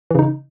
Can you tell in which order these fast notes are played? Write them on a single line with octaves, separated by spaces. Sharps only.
E3 C#3 D#4